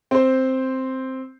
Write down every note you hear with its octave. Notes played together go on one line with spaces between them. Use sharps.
C4 C5